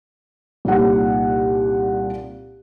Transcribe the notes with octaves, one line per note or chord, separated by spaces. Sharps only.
C2 A#2 D#4 F#5